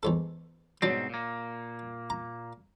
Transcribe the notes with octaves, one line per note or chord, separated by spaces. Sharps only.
E2 G#2 A4
G#2 B2 F#3 C4 D4
A#2 A#3
A#5